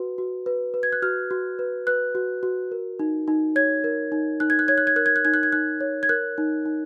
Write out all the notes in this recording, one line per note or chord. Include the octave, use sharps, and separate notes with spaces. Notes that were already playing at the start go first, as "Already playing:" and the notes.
Already playing: F#4 B4
F#4
B4
B4
G#6
F#6
F#4 F6
F#4
B4
B4 F#6
F#4
F#4
A#4
D#4
D#4
C#5 G#6
A#4
D#4
D#4 F#6
G#6
F#6
C#5 G#6
F#6
G#6
A#4 F#6
G#6
F#6
D#4 G#6
F#6
G#6
D#4 F#6
C#5
G#6
A#4 F#6
D#4
D#4